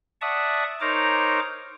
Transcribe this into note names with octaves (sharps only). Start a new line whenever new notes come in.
D5 E5 F#5 A5 C#6 D#6
D#4 A#4 C5 C#5 A#5 D6